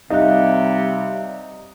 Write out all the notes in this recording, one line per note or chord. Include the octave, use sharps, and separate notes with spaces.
C3 G3 D#4 E5 F5 F#6